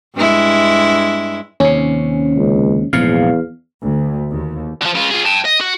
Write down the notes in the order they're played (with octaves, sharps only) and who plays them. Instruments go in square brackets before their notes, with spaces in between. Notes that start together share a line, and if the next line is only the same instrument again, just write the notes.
[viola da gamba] G2 G#3 E4
[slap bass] D#2 C3 [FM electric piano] C#4
[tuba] C#2
[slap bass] A#1 G#2 C3 [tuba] E2 [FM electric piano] F5
[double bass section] D2
D#2
[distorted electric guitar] D3 F3
C#3 F4
F4 G#4
G5 A5
D#5
F#4